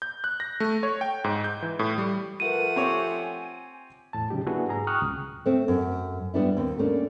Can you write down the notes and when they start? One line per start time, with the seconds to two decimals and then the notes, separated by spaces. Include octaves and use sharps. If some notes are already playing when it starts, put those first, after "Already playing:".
0.02 G6
0.24 F#6
0.40 A#6
0.60 A3
0.83 C#5
1.01 G5
1.24 G#2
1.44 G6
1.62 E3
1.79 A2
1.98 G3
2.40 F3 A3 A#4 B4 F#5 D#7
2.76 C4 G4 C#5 G#5
4.13 E2 A2 A5
4.30 C#3 F#3 D#4 G4
4.46 A#3 D4 E4 F#4 G#4 B4
4.68 G#2 G#4 A#5
4.87 G5 C#6 D#6 F6 F#6
5.02 C#2
5.46 A3 C4
5.68 F#2
6.34 G3 B3 D4 E4
6.57 D#2 C4
6.78 A3 A#3 C#4 D4